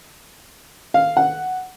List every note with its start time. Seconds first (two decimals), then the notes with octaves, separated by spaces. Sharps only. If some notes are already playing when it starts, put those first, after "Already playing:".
0.94 F5
1.17 F#5